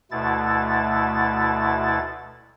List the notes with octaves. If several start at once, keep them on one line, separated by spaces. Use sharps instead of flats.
D2 B2 A3 E4 A6